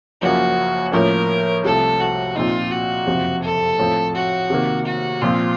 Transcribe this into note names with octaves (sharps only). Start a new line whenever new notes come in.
F#1 F#2 F3 A#3 C#4 F#4
A2 F3 A#3 C#4 A#4
C2 C3 F3 A3 A4
F#4
A#2 F3 C4 D#4 F4
F#4
F#1 F2 C3 F3
A4
A2 F3 C4
F#4
C3 D#3 A#3
F#4
A#2 F3 C4 F4